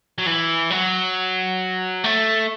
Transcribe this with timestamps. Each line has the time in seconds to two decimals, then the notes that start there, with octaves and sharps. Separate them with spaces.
0.18 F#3
0.27 E3
0.70 F#3
2.04 A3